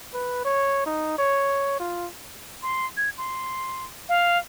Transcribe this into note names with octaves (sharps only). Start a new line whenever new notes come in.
B4
C#5
D#4
C#5
F4
C6
G#6
C6
F5